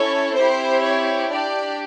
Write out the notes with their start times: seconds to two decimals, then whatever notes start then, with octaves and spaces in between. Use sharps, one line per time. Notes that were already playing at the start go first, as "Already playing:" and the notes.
Already playing: C#4 E4 A4 C#5
0.34 C4 E4 G4 C5
0.82 C#5
1.30 D4 G4 D5